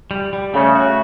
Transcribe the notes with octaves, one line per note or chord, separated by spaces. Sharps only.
G3
G3
C#3 A3
F#4